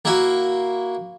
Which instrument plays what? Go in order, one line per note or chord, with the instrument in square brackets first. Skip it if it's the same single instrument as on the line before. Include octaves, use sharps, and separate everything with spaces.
[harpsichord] A#3 E4 F#4